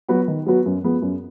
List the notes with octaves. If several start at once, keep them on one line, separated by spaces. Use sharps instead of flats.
F#3 B3 F#4 B4
D#3
F#3 B3 F#4 B4
F#2
F3 G#3 B3
F#2